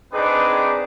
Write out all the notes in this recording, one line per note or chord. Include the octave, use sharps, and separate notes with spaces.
C4 D4 D#4 G#4 B4 D6